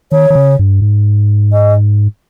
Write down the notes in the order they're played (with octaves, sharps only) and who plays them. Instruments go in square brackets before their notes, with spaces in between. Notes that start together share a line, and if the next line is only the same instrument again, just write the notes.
[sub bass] D#3 [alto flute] C#5
[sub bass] D#3
C#3
G2
G#2
[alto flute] D#5